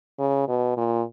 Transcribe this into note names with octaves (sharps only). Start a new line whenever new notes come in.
C#3
B2
A#2